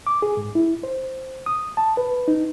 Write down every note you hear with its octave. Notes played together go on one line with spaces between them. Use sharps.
D6
G#4
G#2
E4
C5
D#6
A5
B4
D#4